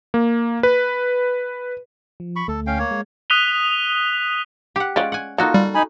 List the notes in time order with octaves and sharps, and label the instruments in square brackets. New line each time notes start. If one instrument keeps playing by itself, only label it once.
[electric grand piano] A#3
B4
[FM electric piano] F3
[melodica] B5 C#6
[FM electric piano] D2 A3 [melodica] A4
[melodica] C#4 F5 G5
A#3 C#5
[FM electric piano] G#3
[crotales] D#6 F#6 B6 D#7 F7 G7
[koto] G4 F#5
[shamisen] G#3 F4 [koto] C#4 D5 F#5
[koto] F#5 G#5
[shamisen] A#3 [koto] D#4 F#4 A4 [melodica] F4
[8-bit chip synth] G3
[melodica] D#4 G#5 B5